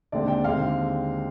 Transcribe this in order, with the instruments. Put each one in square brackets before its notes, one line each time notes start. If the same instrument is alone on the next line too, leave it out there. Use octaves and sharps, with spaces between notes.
[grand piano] D#2 D3 G#3 C4 D5
G5
D#2 D3 G#3 C4 F5